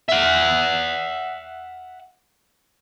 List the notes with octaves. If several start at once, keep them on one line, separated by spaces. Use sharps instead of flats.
E5 F#5